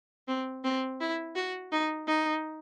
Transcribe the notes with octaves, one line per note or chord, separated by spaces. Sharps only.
C4
C4
E4
F#4
D#4
D#4